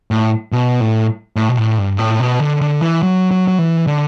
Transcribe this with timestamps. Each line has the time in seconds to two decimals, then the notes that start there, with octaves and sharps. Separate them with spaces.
0.11 A2
0.52 B2
0.81 A2
1.36 A2
1.49 B2
1.57 A2
1.78 G2
1.99 A2
2.20 B2
2.40 D3
2.61 D3
2.82 E3
3.02 F#3
3.31 F#3
3.48 F#3
3.59 E3
3.87 D3